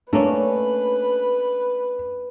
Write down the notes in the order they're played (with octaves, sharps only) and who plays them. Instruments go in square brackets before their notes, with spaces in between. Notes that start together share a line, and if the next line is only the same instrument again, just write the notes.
[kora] A3 A#3 C#4 [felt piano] D4 [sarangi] B4